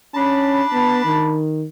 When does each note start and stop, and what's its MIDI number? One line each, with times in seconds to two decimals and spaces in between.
0.15 0.63 61
0.15 1.40 62
0.15 1.40 81
0.15 1.40 83
0.73 1.04 59
1.05 1.65 51